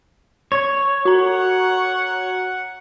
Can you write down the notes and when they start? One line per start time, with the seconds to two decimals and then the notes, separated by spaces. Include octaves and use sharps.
0.52 C#5
1.05 F#4 F#5 A#5